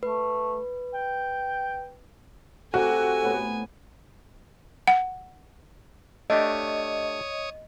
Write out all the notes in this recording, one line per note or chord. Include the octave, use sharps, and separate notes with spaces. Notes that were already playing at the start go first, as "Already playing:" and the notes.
A3 B4
G5
C3 D#4 F#4 A4 G#5 D6
A2 B3
F#5
A3 D4 G4 C#5 D#5 D#6